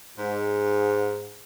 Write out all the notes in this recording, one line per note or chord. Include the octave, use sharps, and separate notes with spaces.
G#2